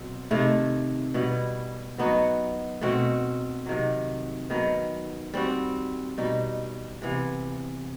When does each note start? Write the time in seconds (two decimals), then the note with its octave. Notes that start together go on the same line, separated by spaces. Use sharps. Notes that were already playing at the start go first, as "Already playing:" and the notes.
Already playing: B2 F#3 C4
0.30 C3 D#3 A3 E4
1.14 B2 G3 B3 E4
1.98 F#3 B3 D#4 F#4
2.81 B2 A3 C4 F#4
3.66 C3 D#3 F#3
4.50 D#3 F#3 B3
5.34 G3 C4 F#4
6.18 B2 G3 D#4
7.02 C3 E3 B3